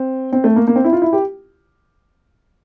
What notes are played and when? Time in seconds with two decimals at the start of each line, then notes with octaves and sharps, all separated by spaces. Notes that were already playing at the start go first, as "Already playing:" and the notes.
Already playing: C4
0.33 C4
0.44 A3
0.56 A#3
0.68 A#3
0.76 C4
0.84 E4
0.93 F4
1.02 E4
1.13 G4